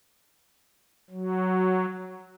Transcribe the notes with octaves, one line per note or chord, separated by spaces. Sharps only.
F#3